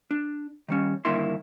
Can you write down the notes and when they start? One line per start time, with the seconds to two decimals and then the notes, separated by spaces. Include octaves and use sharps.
0.11 D4
0.68 D#3 G3 C#4
1.05 G2 D3 D#3 A#3 E4 C6